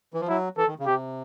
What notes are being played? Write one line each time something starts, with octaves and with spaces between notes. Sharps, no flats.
E3
F3
F#3 E4
E3 A4
D#3
C#3
C3 G4